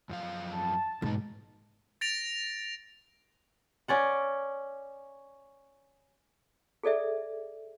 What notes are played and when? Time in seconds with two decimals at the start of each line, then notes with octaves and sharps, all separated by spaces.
0.09 F#2 F3 F5
0.53 A5
1.02 G#2 B2 D#4
2.01 A6 A#6 D7 F7
3.88 C#4 D5 F#5
6.83 G#4 A4 D5 E5